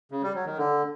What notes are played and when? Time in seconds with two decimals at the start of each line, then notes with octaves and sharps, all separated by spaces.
0.11 C#3
0.23 G3
0.34 F#3
0.46 D#3
0.58 D3